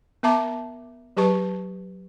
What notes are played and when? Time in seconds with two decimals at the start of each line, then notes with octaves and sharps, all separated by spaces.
0.23 B3 A#4 E5 A5 A#5 D6
1.17 F#3 G4 B4 A5 C#6